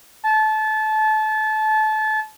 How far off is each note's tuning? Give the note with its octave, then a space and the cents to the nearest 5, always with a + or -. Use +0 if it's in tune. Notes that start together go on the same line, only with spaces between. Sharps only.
A5 -25